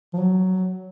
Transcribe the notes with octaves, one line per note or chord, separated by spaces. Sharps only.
F3
F#3